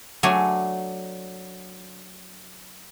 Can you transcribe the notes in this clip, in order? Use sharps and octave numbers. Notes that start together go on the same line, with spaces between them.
F#3 A3 D4 G#5